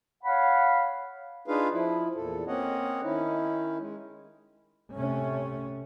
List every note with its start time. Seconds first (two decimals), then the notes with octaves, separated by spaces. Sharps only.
0.24 C#5 F5 F#5 B5
1.48 D4 D#4 F4 G#4 B4 F5
1.72 F3 E4
2.15 E2 A#2 A4
2.47 A#3 C4 C#4 C#5 D#5 F#5
3.03 D#3 C#4 D#4 E4
3.79 G#3
4.95 C3 A3 C#4